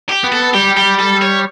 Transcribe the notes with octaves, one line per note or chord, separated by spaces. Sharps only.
G4
B3
A4
G3 G4
G4
A4
C#5